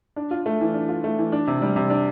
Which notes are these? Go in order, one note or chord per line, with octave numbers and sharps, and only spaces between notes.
D4
F4
A3
E3
D4
F4
A3
E3
D4
C3
G3
C3
D4